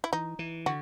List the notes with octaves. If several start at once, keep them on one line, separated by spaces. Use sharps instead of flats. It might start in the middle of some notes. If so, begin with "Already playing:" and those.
E4
E3 D#4
E3
D3 F#4